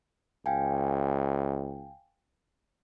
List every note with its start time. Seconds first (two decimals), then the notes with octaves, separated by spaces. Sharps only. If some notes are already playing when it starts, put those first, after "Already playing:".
0.46 C#2 F5 G5 G#5